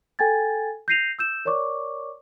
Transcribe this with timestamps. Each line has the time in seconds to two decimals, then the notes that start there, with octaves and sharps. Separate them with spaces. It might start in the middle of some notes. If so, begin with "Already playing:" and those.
0.19 A4 G5 G#5 G#6 A6
0.88 G6 A#6 C7 D#7 F7
1.19 E6 G6 E7
1.45 A#4 C#5 D5 C#6 D6